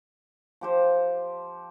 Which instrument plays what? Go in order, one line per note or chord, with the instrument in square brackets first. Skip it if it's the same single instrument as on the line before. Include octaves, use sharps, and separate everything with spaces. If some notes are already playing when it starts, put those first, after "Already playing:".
[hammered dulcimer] F3 G4 C5